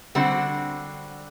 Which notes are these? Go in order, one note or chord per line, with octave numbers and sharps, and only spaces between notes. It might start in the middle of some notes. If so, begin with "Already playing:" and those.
D3 G3 C4 F#4 C5